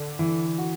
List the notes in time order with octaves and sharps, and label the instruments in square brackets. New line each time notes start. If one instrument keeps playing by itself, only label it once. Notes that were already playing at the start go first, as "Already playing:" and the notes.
Already playing: [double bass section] D3
[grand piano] E3
F#4